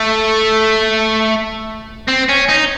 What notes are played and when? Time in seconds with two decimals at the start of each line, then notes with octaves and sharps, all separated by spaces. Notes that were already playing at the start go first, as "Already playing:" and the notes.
Already playing: A3
2.08 C4
2.29 C#4
2.49 D#4